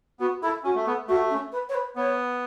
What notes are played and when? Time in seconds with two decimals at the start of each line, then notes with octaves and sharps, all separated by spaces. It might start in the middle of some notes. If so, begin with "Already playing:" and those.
0.20 B3 F#4
0.42 E4 A4
0.64 C#4 F#4
0.75 A3
0.86 B3 A4
1.07 A3 F#4
1.30 C#4
1.52 B4
1.69 C#5
1.74 B4
1.96 B3 C#5